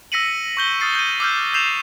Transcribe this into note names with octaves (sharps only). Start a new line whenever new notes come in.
E6 A#6 B6 C#7 D#7 F#7
C#6 G6 G7
D#6 F6 A6 C7 D#7
G6 D#7
D6 E6 F6 G6
E6 G6 C7 E7 F7